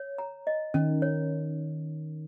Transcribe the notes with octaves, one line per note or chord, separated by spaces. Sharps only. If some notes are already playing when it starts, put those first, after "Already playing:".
Already playing: C#5
A#5
D#5
D#3 C#4
C#5